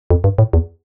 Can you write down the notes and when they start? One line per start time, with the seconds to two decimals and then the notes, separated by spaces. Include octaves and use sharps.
0.11 F2
0.24 G2
0.38 A2
0.53 E2